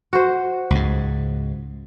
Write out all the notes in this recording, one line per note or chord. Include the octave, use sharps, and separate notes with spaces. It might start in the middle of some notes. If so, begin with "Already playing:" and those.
F#4 C5
C#2 G#2